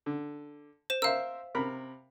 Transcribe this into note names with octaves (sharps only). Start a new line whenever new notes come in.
D3
C5 E7
A#4 C5 E5 F5 E6
C3 A#4 B5